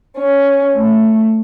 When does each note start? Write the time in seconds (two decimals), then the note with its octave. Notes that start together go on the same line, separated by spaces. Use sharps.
0.16 C#4
0.76 A3